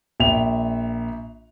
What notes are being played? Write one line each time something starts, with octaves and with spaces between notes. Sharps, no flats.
A#1 E5 G5 F7